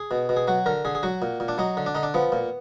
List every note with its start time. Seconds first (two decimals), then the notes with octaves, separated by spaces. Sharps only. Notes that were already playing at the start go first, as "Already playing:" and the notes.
Already playing: G#4
0.11 B2
0.29 B2
0.36 G#4
0.48 F#3 F#4
0.66 D3 A#4
0.85 D3 G#4
0.95 G#4
1.03 F#3 F#4
1.22 A#2
1.40 A#2
1.48 D4
1.58 F#3 D#4
1.77 D3
1.86 D4
1.95 D3 D#4
2.03 D4
2.14 F3 B3
2.32 A#2